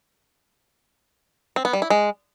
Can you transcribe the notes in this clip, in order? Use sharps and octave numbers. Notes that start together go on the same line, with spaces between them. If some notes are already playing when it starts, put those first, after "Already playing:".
C4
B3
G3
E4
G#3